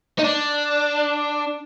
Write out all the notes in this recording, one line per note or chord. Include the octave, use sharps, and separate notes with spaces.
D#4
D4